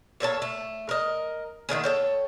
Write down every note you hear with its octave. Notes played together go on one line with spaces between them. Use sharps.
A#2 A4 C#5 A5
A3
A#4 D#5
D3 D#3 A3 C#4
A4 C#5 G5